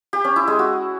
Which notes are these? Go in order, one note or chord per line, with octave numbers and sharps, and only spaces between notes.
G4
C#4
E4
G#3
F#4